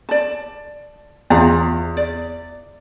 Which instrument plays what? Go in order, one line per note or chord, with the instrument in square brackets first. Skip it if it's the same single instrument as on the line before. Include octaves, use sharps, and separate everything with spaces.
[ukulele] D5 A5
[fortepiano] E2 [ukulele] F4 C5 A#5
[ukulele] D5